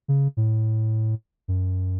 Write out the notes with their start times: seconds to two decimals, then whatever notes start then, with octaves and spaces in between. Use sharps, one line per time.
0.08 C#3
0.37 A2
1.48 F#2